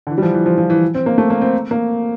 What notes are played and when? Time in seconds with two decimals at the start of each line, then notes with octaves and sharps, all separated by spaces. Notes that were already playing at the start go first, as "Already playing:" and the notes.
0.07 D3
0.10 E3
0.18 G3
0.22 F3
0.34 E3
0.46 F3
0.58 F3
0.70 E3
0.95 C4
1.06 A#3
1.18 A3
1.30 A#3
1.42 C4
1.71 A#3